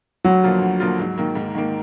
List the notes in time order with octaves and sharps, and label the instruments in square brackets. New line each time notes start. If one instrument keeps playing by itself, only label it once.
[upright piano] D2 [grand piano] F#3
[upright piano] D3 F3 A#3 F4
D2
D3 F3 A#3 F4
G#2
D#3 A#3
G#2
D#3 A#3